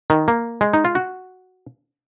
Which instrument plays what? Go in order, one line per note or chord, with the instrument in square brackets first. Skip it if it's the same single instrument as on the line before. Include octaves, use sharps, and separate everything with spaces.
[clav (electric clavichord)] D#3
A#3
G#3
D#4
F4
F#4